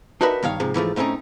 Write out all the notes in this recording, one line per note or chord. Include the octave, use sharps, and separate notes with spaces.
D4 D#4 F#4 A#4 B4 E5
G2 D#3 C#5 F5
G#2 C3 F3
G#2 E3 F3 A3
A2 A3 C4 C#4 D#4